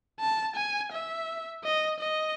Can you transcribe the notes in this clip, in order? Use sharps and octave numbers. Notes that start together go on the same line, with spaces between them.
A5
G#5
E5
D#5
D#5